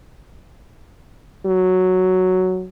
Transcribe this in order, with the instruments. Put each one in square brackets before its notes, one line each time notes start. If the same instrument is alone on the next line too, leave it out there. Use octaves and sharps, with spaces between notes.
[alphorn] F#3